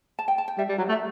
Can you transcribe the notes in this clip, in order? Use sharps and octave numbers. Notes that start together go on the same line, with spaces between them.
A5
G5
A5
G5
G3 E5
G3
F#3
A3
E5